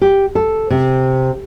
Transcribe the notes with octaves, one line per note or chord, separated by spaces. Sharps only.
G4
A4
C3